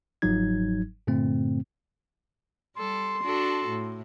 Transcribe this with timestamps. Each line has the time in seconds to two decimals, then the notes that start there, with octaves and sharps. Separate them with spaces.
0.22 G1 G#2 F3 F#3 D#4 G#6
1.07 G2 A#2 D3 A3 C4
2.76 G3 A4 C6
3.23 D4 F#4 A4
3.68 A2